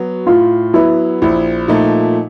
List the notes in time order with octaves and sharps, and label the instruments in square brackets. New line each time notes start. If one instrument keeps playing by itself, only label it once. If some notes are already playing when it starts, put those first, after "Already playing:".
Already playing: [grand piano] F#3 B3 [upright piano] F#4
[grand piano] A2 [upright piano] F4
[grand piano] F#3 B3 [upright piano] E4
[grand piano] A#1 [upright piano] E4
[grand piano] A#2 F3 A3 [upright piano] D#4